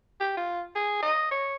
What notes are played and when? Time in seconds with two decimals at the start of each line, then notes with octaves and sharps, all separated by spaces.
0.20 G4
0.37 F4
0.75 G#4
1.02 D#5
1.31 C#5